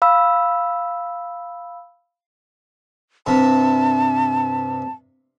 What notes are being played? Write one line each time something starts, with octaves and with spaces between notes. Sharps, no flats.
F5 B5 E6
G2 C3 A5